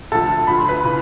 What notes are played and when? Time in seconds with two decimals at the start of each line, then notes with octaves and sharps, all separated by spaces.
0.12 D2 D3 F3 A4 A5
0.47 D2 D3 F3 B5
0.57 C6
0.68 B4 B5
0.84 C#3 E3